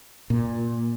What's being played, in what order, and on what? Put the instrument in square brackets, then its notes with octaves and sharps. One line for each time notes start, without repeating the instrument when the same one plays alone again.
[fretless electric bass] A#2